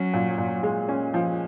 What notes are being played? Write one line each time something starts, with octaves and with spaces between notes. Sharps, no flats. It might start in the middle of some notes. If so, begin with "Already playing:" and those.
Already playing: F#3 C#4
A#2
A#2
G#3
C#4
F3